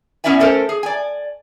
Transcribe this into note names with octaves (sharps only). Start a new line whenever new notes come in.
B3 C#4 E4 D5 E5 G#5
A3 C#4 A4 A#4 C5
G#4
D5 G#5